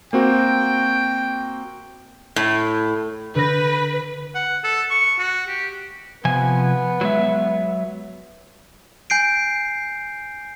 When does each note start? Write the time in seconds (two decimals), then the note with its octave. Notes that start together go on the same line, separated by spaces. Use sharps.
0.13 A#3 C4 F#4 G5
2.36 A2
3.35 D3 B4 G6 A#6
4.35 F#5
4.64 A4
4.90 C#6
5.19 F#4
5.48 G4
6.25 C3 F3 B3 G#5
7.01 F#3 G#3 E5
9.10 G#5 G6 C7 D7